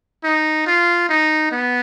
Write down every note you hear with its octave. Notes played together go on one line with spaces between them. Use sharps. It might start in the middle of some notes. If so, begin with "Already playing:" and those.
D#4
F4
D#4
B3